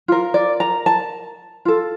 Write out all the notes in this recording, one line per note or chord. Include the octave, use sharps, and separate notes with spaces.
F4 A#4
D5
A#5
A5
F4 A4